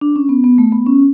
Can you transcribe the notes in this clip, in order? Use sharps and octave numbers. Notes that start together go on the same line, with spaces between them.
D4
C#4
B3
B3
A3
B3
C#4